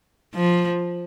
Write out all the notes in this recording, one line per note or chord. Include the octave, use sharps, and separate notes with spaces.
F3